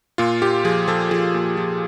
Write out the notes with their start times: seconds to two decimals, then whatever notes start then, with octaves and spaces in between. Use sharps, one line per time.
0.18 A#2 F4
0.42 A#2 G4
0.64 F3 G#4
0.88 F3 A4
1.11 F3 G#4
1.34 A#2
1.57 F3